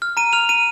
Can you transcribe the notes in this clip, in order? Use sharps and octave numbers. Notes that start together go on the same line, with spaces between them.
F6
A#5 D#7
F6 F7
A#5 D#7